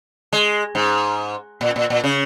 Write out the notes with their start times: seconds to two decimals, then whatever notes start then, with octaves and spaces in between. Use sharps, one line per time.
0.33 G#3
0.75 G#2
1.61 A#2
1.76 A#2
1.90 A#2
2.04 C#3